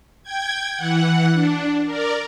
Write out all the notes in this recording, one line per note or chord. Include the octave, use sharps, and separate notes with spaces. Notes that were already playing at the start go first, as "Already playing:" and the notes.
G5 G#6
E3 F#5
D4
A#4 D5